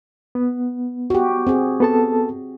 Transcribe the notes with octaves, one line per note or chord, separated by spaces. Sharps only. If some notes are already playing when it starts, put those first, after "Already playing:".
B3
F#4 G4
C4 G#4
B3 A4 A5